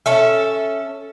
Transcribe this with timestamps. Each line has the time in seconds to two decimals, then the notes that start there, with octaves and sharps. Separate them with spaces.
0.06 C#4 A4 E5